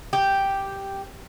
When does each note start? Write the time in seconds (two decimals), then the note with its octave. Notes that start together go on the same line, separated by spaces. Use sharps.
0.13 G4